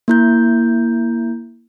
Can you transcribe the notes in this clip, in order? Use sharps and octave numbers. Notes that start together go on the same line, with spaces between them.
A#3 E4 G6